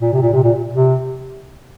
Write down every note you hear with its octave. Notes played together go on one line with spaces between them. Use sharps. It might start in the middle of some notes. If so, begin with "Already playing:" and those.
A#2
C3
A#2
C3
A#2
C3